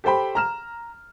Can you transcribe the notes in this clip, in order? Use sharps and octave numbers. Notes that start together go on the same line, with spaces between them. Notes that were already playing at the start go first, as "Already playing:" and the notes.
G4 A4 C5 G5 B5
A#5 F6 E7